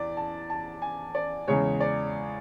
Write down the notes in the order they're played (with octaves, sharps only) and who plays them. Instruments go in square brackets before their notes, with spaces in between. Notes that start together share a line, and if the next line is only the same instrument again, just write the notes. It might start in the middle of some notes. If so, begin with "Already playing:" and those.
Already playing: [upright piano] E2 D5
A5
A5
G#5
D5
E2 C#3 G#3 C#5
D5